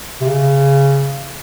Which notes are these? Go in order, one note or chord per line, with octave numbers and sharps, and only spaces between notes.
C3
C#3